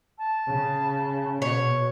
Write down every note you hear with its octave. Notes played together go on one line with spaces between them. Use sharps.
A5
C#3
B2 C#5